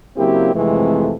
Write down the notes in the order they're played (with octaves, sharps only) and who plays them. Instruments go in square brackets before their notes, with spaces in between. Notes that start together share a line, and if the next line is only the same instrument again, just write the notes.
[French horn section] C#3 F#3 A#3 C4 E4 G4
F2 C3 E3 G#3 A3